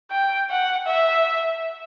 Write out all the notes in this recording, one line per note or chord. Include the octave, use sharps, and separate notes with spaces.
G5
F#5
E5